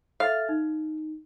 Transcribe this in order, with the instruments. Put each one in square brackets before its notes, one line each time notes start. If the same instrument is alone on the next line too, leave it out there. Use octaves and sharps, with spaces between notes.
[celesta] A4 E5 A6 [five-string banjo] F5
[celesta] D#4